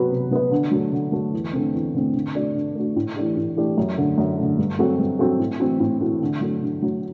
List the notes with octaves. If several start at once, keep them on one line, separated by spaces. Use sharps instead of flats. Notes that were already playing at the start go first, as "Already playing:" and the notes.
Already playing: C3 F#3 B3 F#4 B4
C3
F#3 B3 F#4 B4
D3
F#3 A3
D3
F#3 A3
E2
D3 A3 C4
E2
D3 A3 C4
D3
A3 D4 F#4
D3
A3 D4 F#4
A2
E3 A3 D4 G4
A2
E3 A3 D4 G4
F#2
D3 A3
F#2
D3 A3
G2
F#3 C4 F#4 A4
G2
F#3 C4 F#4 A4
A2
E3 A3 C4 F#4
A2
E3 A3 C4 F#4
D3
F#3 A3
D3
F#3 A3